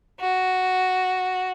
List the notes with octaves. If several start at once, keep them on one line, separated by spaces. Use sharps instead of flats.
F#4